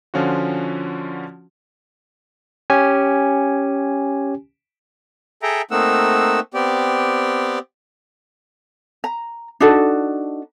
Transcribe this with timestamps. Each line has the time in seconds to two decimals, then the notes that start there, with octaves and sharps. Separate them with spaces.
0.14 D3 F3 C#4 F4 F#4
2.70 C#4 G4 G#5
5.43 G#4 A4 E5 G5 A#5
5.71 A3 A#3 C4 D#4 F#5 E6
6.54 B3 C4 G4 D5
9.04 A#5
9.60 D4 D#4 F#4 A4